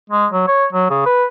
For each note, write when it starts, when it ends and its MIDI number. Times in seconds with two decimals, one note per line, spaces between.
0.10 0.26 56
0.31 0.47 54
0.48 0.66 73
0.73 0.88 54
0.90 1.04 49
1.06 1.25 71